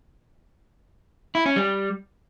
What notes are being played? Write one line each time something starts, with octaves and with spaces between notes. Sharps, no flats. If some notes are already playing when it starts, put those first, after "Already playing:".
E4
C#4
G3